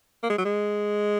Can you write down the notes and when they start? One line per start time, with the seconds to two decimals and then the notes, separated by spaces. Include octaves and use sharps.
0.23 A#3
0.30 G#3
0.38 F#3
0.45 G#3